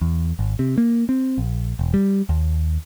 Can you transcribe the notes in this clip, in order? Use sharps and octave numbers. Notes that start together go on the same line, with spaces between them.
E2
G#1
C3
A#3
C4
A#1
E1
G3
D#2